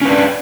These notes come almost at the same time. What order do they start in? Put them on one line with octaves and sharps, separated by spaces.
C#4 B4 D4